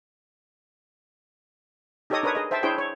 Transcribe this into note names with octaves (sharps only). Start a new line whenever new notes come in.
D#4 G4 A4 C#5 D#5 D#6
D4 A#4 B4 C#5 D#6
G#4 D#5
C5 E5 G5 A5
D4 E4 G#4 C5 C#5 G5
C#5